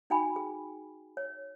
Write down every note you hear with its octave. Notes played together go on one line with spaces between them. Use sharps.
D#4 F#4 G5 G#5 B5
G#4
C#5